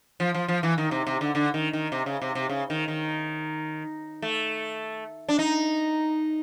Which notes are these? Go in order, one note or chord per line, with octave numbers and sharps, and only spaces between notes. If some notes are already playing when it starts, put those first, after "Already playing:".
F3
F3
F3
E3
D#3
C3
C3
D3
D3
D#3
D#3
C3
C#3
C3
C3
C#3
D#3
D#3
A3
D4
D#4